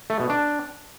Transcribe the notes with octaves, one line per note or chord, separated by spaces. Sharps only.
A3
B2
D4